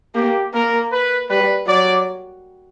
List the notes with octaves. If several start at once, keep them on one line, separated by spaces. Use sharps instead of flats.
A#3 G4
A#3 A#4
B4
G3 B4
F#3 D5